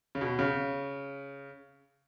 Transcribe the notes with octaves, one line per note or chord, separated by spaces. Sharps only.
C#3
B2
C#3